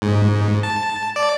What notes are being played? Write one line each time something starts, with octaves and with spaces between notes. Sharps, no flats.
G#2
A5
D5